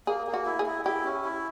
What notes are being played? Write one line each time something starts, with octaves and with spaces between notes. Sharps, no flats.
A#3 G#4
A#3
F#4
E4
G#4
E4
E4 G4
C#4
E4